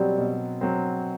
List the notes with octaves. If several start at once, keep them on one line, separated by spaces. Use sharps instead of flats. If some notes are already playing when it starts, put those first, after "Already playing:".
Already playing: B2 F#3 G3 C4
B2
F#3 C4